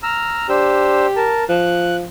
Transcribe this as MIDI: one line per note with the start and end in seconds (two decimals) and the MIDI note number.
0.03 0.47 82
0.03 0.47 88
0.03 0.47 89
0.49 1.07 62
0.49 1.34 67
0.49 1.07 72
0.49 1.07 88
1.16 1.44 70
1.16 1.44 81
1.49 2.07 53
1.49 1.96 90